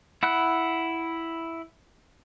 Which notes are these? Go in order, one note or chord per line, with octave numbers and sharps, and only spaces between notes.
E4 F#5 B5 F#6